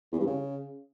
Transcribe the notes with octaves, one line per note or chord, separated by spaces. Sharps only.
E2
G2
C#3